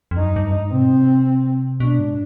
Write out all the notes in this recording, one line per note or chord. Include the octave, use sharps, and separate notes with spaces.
F2
F#2 D#4
G2
G#2
C3 C4
B2
C3
B2 D4
G#2